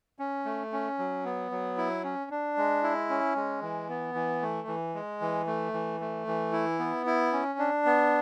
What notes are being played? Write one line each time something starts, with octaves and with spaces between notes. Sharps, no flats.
C#4
A3
C#4
F#3
B3
F#3
E4
C#4
D4
G#3
E4
C#4
G#3
E3
B3
E3
A3
E3
G#3
E3
A3
E3
A3
E3
E4
B3
E4
C#4
D4
B3